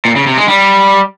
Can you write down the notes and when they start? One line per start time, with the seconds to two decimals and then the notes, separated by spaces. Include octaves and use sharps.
0.05 A#2
0.16 C#3
0.27 C3
0.37 G#3
0.48 G3